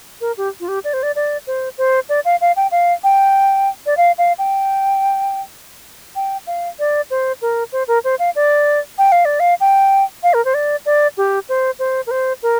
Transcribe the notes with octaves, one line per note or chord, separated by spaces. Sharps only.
A#4
G4
F4
G4
D5
C5
D5
D5
C5
C5
D5
F5
F5
G5
F5
G5
D5
F5
F5
G5
G5
F5
D5
C5
A#4
C5
A#4
C5
F5
D5
G5
F5
D5
F5
G5
F5
A#4
C5
D5
D5
G4
C5
C5
A#4
C5
A#4